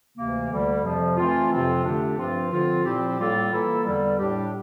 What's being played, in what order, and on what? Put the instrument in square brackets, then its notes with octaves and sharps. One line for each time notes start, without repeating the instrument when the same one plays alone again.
[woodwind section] D2 C3 E3 A#3
D2 D3 G3
F2 C3 F3
E3 A3 C4 F4
F2 C3 F3 C4 F4
D3 A3 D4 G4
G2 F3 C4 F4
D3 F3 C4 F4
A#2 F3 C4 E4 G4
A2 G3 A#3 F4 A4
E3 A#3 E4 A4
E2 D3 G3
A2 G3 D4 G4